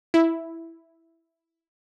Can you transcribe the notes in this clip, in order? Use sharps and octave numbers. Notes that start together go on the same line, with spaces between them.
E4